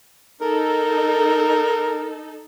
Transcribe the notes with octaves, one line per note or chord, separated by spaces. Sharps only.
D#4 A4 A#4